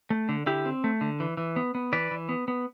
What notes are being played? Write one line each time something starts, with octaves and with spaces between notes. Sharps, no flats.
A3
D3
D3 E4 G4
C4
A3
D3
E3
E3
B3
B3
E3 B4 D5
E3
B3
B3